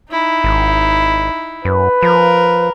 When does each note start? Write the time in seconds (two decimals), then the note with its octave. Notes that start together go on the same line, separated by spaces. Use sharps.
0.10 D#4 E4
0.44 G#1
1.65 F#2 B4
2.03 F3 A#4